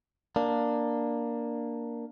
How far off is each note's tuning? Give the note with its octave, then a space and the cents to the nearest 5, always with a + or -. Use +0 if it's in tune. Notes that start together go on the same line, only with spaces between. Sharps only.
A#3 +5 D4 +10